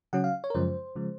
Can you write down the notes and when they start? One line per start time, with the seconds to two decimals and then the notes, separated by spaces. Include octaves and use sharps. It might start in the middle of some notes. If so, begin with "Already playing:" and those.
0.13 C#3 F#3 C#4 F#5
0.24 F5
0.44 C#5
0.50 A#4
0.54 F#2 C#3 F3 G#3 C5
0.96 C#3 F3 G#3